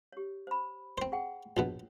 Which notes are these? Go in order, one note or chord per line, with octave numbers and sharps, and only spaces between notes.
G4 C#5
C5 B5
C4 C5
G#4 F#5 G5
A#1 B2 B3 C#5